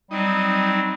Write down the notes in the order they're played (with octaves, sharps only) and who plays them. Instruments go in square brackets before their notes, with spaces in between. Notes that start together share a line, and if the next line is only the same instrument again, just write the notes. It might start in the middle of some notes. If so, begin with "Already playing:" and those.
[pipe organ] F#3 C4 [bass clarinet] G3 [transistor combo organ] D#4